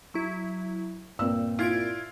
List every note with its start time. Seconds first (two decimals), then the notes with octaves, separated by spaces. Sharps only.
0.14 F#3 E4
1.19 G2 A#2 C4 E6
1.59 E4 F4 G#6 D7